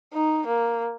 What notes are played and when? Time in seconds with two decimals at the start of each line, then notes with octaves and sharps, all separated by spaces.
0.13 D#4
0.47 A#3